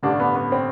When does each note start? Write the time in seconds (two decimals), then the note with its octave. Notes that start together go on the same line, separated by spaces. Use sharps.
0.03 A1 G2 D3 D4
0.20 B3
0.36 B3
0.52 C4